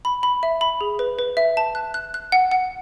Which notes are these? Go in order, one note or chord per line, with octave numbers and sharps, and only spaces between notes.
B5
B5
E5
B5
G#4
B4
B4
E5
A5
F#6
F#6
F#6
F#5
F#5